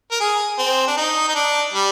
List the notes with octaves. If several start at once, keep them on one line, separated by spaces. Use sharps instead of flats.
A#4
G#4
C4
D4
D#4
D#4
D4
G3